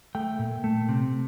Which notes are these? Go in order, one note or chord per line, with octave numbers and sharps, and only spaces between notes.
A3 G5
A#2
A3
C3